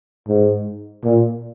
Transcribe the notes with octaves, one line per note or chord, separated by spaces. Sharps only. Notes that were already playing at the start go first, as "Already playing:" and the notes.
G#2
A#2